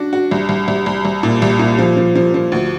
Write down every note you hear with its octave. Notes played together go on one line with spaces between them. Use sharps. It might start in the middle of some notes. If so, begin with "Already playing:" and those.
Already playing: D4 F#4
F#4
C2
C2
C2
C2
C2
A#2
C2
A#2
F3
F3
F3
F3
D2